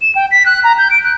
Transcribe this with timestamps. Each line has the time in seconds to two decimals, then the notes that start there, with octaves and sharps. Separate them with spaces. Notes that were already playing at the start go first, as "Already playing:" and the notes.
0.02 E7
0.15 G5
0.31 B6
0.46 F#6
0.64 A#5
0.78 G6
0.91 D7
1.04 F#6